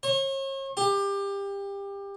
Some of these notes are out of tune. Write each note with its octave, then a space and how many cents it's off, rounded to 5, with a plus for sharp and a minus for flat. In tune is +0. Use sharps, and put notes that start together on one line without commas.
C#5 -40
G4 +25